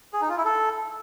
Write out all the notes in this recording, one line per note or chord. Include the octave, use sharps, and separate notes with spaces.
G#4
D#4
F4
E4
A4